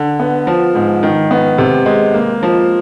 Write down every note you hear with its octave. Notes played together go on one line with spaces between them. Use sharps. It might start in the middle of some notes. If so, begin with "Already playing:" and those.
Already playing: D3
B3
F3
G#2
D#3
B3
C3
G#3
A#3
F3